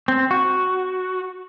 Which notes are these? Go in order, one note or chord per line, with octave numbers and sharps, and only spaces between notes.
C4
F#4